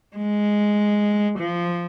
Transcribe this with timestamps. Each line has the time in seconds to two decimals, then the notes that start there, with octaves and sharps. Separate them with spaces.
0.16 G#3
1.39 F3